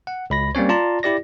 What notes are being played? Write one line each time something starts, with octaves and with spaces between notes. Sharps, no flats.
F#5
C#2 B5 A#6
G3 A#3 C4 C#4 C#5
F4 D5 A5 A#5 C6
E4 G4 D5 A#6